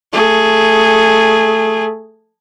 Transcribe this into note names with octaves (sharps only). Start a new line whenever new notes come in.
A3 G#4